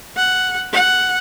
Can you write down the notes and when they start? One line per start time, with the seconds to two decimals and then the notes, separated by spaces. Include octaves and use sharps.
0.16 F#5
0.72 F#5